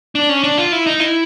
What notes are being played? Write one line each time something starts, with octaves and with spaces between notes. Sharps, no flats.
D4
C#4
D4
F4
E4
D#4
E4